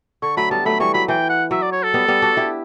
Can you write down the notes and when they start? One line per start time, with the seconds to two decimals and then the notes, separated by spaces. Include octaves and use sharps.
0.22 D3 C#6
0.37 F#3 A3 B5
0.51 G3 B3 A5
0.65 F#3 A3 B5
0.80 E3 G3 C#6
0.94 F#3 B5
1.08 E3 G5
1.29 F#5
1.51 F#3 E5
1.62 D5
1.72 C#5
1.83 A4
1.94 G3 B3
2.08 G3 B3
2.22 D4 F#4
2.37 E4 G4